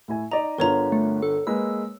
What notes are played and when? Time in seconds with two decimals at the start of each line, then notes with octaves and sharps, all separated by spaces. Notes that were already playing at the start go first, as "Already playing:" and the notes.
0.08 A2 E4 G#5
0.31 D#4 D5 D#5 A#5
0.58 G1 D3 F4 A#4 C#5 A#5
0.92 A3
1.22 A4
1.47 G#3 A#3 B4 E6